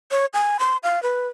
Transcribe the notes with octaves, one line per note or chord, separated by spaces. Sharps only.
C#5
G#5
C6
F5
B4